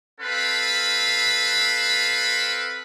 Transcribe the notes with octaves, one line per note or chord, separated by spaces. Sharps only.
C4 A4 B4 F5 B5